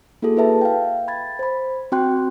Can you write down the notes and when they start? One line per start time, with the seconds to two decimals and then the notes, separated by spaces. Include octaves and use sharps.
0.22 A#3 E4 F#4 G#4 A4
0.37 E4 B4 E5 A5
0.61 F5 G5
1.08 B5 G#6 A6
1.39 C5 B5
1.92 C4 F#4 G5 C6 F#6